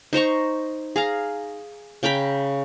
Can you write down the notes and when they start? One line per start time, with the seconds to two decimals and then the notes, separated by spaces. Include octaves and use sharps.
0.13 D#4 C5 A#5 C#6
0.96 G#4 F5 A#5
2.03 C#3 G5 A#5 B5